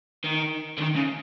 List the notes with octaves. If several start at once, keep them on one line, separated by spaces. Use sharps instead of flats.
D#3
D3
D#3
C#3